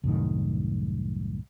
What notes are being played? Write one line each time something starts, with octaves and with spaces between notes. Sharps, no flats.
C2 F#2 A2 D#3